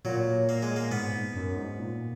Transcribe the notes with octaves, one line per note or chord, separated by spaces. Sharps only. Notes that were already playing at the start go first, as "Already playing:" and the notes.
A#2 F#3
A#3
G#3
A#3
G#2 B3
F#2
G#2
A#2